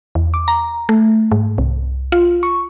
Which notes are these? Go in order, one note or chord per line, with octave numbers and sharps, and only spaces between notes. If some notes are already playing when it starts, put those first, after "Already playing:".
E2
D6
A#5
A3
G#2
C2
F4
C#6